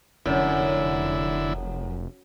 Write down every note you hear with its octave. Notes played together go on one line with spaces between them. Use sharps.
F1 F#2 D3 E4